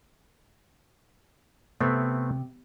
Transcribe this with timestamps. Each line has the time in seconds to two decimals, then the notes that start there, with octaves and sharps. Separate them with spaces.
1.81 C3 A3 B3 C4